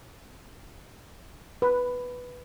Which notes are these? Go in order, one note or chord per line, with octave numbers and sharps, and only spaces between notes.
B4